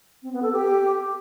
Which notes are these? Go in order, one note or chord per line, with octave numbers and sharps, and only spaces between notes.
C4
B3
A4
G4